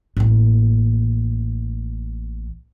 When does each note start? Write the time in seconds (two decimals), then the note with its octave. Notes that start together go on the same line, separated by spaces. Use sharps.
0.17 A1 A#3